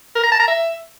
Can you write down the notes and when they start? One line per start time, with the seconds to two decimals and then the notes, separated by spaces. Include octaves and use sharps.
0.16 A#4
0.24 A#5
0.32 A5
0.40 A#5
0.48 E5